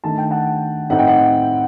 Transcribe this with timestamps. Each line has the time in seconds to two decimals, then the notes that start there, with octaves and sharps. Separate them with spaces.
0.04 D#3 A3 D4 A5
0.18 G5
0.31 F#5 A5
0.90 A2 A3 C4 D#4 F#5
0.99 G5
1.08 F#5